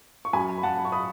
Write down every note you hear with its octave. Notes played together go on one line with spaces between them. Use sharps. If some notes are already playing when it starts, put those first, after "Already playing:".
C#6
F#2 G#5 B5
B5
F#2 F#5 A5
B5
C#6
B5 D#6